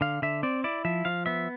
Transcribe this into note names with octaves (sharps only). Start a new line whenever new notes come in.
D3 F5
D3 E5
C4 D5
E4 D5
F3 E5
F3 F5
B3 E5